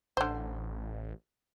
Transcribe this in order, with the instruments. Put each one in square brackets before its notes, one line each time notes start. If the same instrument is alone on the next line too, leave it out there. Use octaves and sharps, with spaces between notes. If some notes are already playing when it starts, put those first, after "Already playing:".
[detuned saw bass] A1 [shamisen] D3 C5